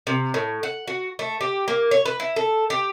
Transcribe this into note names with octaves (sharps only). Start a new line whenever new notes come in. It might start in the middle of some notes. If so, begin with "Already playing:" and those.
C3
A2
F#5
F#4
A3
G4
A#3
C#5
B4
E4
A4
G4